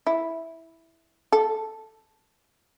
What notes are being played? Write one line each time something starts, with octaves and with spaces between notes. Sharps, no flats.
E4
A4